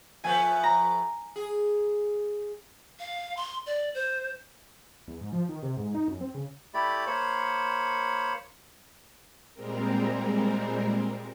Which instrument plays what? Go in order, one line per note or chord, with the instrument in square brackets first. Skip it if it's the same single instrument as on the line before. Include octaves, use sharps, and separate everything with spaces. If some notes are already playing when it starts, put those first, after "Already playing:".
[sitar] F3 A3 B3 [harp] G#5
[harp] A#5
[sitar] G#4
[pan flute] F5
C6
D5
C5
[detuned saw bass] E2
G#2
F3
D#3
C3
G#2
D#4
F#2
C4
C#3
[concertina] A3 E4 G4 D5 B5
A#3 C5 C#5 B5
[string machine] A#2 G3 G#3 C4 A#4